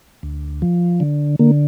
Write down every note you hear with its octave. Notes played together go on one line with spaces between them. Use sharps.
D2
F3
D3
D3 A#3